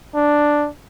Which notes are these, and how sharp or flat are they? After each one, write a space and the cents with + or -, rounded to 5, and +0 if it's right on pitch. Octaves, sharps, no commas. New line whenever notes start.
D4 +0